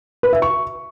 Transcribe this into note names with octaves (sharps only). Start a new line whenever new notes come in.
B4
E5
C#6